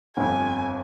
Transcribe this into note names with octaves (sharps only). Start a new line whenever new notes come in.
G1 F2 G#5